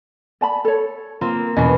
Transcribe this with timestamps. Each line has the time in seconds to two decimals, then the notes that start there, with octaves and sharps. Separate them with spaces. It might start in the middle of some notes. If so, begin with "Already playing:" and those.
0.41 D5 A5 B5
0.65 A4 C#5
1.21 A#3 C4 F4
1.56 E2 B2 C#4 D#5